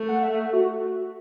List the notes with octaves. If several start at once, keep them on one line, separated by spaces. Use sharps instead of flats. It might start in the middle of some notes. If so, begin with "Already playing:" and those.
Already playing: A3
F#5
E5
F#4